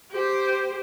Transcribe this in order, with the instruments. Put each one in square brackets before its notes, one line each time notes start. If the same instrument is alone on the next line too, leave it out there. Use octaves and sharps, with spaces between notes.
[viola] G4 C5